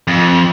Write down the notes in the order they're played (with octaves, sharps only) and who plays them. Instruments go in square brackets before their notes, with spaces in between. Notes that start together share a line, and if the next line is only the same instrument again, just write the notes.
[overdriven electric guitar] F2